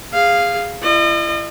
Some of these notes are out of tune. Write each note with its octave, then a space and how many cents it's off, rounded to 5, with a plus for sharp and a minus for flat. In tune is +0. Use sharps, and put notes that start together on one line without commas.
G#4 -20 F5 -5
E4 +40 D#5 -40